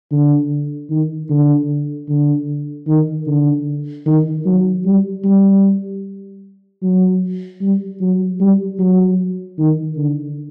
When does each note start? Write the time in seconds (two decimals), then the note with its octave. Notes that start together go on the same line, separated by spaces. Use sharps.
0.12 D3
0.90 D#3
1.30 D3
2.09 D3
2.87 D#3
3.27 D3
4.06 D#3
4.45 F#3
4.85 G3
5.24 G3
6.82 F#3
7.61 G3
8.00 F#3
8.40 G3
8.79 F#3
9.58 D#3
9.97 D3